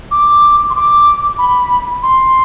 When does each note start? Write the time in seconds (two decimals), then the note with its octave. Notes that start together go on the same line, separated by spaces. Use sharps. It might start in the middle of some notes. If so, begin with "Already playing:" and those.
0.11 D6
0.70 C6
0.75 D6
1.38 B5
2.03 C6